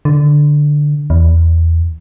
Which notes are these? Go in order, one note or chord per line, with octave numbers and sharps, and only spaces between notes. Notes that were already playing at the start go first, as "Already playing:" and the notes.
D3
E2